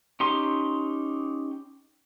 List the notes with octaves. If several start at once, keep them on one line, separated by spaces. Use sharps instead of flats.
C#4 D#4 G4 C6